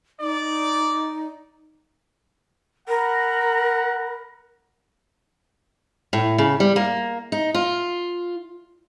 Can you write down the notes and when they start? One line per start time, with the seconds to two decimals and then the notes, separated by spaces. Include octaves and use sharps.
0.21 D#4 D5
2.89 A#4 F#5 B5
6.13 A2
6.38 C#3
6.60 G3
6.76 A#3
7.32 D#4
7.54 F4